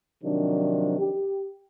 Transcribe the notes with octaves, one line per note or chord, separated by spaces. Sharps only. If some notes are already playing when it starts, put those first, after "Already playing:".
C3 D#3 F3 F#3 D4
G4